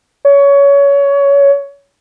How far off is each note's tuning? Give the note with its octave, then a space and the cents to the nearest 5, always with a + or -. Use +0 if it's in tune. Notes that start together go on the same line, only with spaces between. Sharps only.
C#5 +20